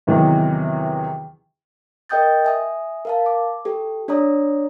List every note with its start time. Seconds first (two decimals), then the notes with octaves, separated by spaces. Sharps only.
0.07 E2 C3 D#3 E3 F#3
2.09 A#4 D#5 G5 D#6 G6 A6
2.45 E5 G#5 D#6
3.05 A#4 F5 A5
3.26 D6
3.65 G4 A4
4.08 D4 C#5 D5 A#5 D#6